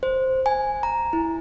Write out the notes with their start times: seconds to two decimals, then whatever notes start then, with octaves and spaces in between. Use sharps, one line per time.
0.03 C5
0.46 G#5
0.83 A#5
1.13 E4